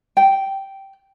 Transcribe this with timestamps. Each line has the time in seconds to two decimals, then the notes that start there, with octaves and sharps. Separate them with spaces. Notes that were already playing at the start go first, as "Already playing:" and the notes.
0.17 G5